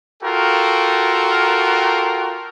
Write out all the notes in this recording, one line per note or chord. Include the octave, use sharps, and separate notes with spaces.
F4 F#4 A4 A#4 G5